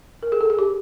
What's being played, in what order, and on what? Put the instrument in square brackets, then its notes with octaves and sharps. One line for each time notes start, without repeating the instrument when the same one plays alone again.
[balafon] A#4
G#4
A4
G#4
G4